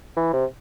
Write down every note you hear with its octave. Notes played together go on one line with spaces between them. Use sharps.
E3
C3